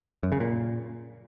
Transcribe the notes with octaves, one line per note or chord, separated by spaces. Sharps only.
F#2
C#3
A#2